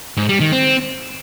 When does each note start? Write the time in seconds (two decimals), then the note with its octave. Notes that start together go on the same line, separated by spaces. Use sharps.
0.17 G#2
0.29 G3
0.40 D#3
0.52 C4